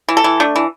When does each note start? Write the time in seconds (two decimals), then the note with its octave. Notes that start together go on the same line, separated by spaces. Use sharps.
0.08 E3
0.17 A4
0.24 E3
0.40 A3 D4
0.56 E3